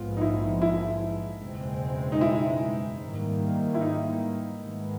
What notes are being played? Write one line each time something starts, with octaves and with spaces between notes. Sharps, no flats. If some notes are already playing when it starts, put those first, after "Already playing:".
Already playing: A#1 G#2 F3 G#3 B3 F4
D#4
E4
E4
F#1 E2 B2 G#3 C4
D#4
E4
G#2 D#3 G3 A#3
E4
D#4
G#2 D#3 G#3 B3